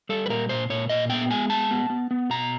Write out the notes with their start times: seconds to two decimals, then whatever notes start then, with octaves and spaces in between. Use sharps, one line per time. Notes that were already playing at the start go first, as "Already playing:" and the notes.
0.09 G3 A4
0.26 B4
0.29 A#2 A#4
0.49 A#2 C5
0.70 A#2 C#5
0.89 A#2 D#5
1.09 B3 G5
1.30 G#3 G#5
1.50 B3 A5
1.71 B3
1.90 B3
2.11 B3
2.30 B2 A#5